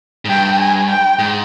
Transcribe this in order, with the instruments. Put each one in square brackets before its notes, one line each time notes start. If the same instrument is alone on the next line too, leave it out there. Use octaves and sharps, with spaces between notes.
[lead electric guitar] G#2
[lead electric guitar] G2 [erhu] G5
[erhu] G#5
G5
[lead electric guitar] G#2